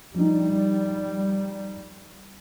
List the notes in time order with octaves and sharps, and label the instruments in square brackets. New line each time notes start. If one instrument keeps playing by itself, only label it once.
[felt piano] F3 D#4 [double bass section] G3